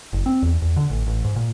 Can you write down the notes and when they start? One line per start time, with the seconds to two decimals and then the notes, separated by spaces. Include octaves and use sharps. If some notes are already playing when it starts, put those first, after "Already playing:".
0.13 F#1
0.26 C4
0.42 E2
0.62 E2
0.76 D3
0.90 A1
1.07 A1
1.24 G#2
1.36 A#2